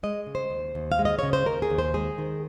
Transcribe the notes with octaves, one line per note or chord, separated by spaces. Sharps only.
G#3 D#5
C#3
C5
D#2
D#2
F5
G#3
D#5
C#3 C#5
C5
D#2 A#4
G#4
D#2
C5
G#3 G#4
D#3